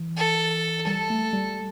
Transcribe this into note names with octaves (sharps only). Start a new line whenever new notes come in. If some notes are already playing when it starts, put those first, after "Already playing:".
Already playing: E3
A4
G3 A4
A3
G3